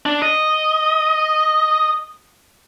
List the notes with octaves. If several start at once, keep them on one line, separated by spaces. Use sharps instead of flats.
D4
D#5